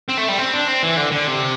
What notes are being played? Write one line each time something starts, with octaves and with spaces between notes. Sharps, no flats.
C4
A3
G3
C4
D4
C4
E3
D3
D3
C3